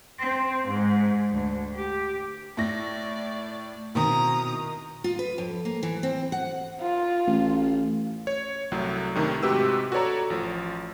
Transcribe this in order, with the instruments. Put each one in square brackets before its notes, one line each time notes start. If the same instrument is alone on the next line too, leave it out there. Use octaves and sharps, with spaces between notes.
[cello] C4
G#2
D2
G4
[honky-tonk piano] A2 E4 A#6 [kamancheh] D5
[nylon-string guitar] B2 C4 E4 [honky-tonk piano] D#3 [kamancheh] A#5 D#6
[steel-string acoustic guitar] F4
B4
F2
A#3
E3
C4
F#5
[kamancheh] F4
[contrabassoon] A1
[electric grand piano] C#5
C2 A2 F#3
A2 C3 D#3 A3 D4
G#2 C3 F#4 G4 B4 E6
F#4 A4 B4 C#5 D5 A#5
A1 F3